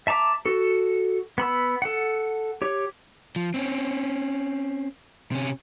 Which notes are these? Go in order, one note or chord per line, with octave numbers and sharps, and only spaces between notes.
E5 A5 A#5 D6
F#4 A4
B3 B5 E6
A4 F#5
G4 C#5
F3
C4 C#4
C3 C#4